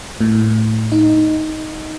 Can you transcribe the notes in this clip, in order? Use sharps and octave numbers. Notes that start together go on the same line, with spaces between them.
A2
D#4